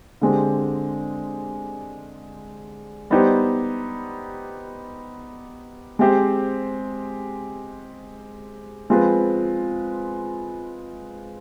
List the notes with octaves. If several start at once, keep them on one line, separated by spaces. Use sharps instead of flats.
D3 G#3 C4 G4
G3 B3 D#4 G4 C5
G#3 C4 G4 C5
F3 G#3 C4 F4 B4